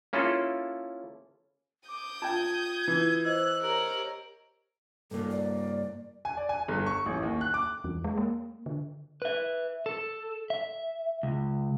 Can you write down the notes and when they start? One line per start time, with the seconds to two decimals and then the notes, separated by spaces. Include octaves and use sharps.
0.13 A#3 C#4 E4 F4 G#4 A4
1.88 D6 D#6 G6
2.22 F4 G5 A5 G#6
2.88 E3
3.24 C5 D#5 E6 F#6
3.60 G4 A#4 C#5 F#7
5.11 G2 A#3 A4
5.30 D5
6.25 G#5
6.37 D5
6.49 G#5
6.68 G1
6.86 C#6
7.06 A1
7.23 D#2
7.41 F#6
7.54 D6
7.84 E2
8.04 G#3
8.18 A#3
8.66 D3
9.22 B4 E5
9.86 A4
10.50 E5
11.23 C#2